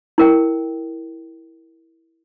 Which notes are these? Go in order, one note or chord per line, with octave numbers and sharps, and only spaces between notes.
E4 A#4 G5